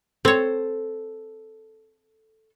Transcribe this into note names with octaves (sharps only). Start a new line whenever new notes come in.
C4 A4 C5 C#5